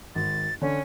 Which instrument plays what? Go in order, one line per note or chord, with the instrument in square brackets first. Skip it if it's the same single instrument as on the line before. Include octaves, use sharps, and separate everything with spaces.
[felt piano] G#1 [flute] A6
[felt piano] D3 [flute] C#4